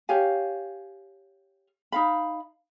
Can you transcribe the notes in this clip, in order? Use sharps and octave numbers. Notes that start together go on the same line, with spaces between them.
G4 C#5 F5 G#5
D#4 F5 B5